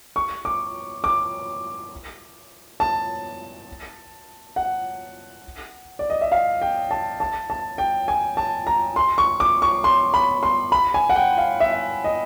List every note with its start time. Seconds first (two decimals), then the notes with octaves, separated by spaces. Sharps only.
0.16 C#6
0.45 D6
1.04 D6
2.80 A5
4.56 F#5
5.99 D5
6.10 D#5
6.21 E5
6.32 F5
6.62 G5
6.91 A5
7.20 A5
7.50 A5
7.78 G5
8.08 G#5
8.37 A5
8.67 A#5
8.96 C6
9.18 C#6
9.40 D6
9.62 C#6
9.84 C6
10.14 B5
10.43 C6
10.72 B5
10.94 G#5
11.10 F#5
11.16 G5
11.38 F5
11.60 E5
12.04 D#5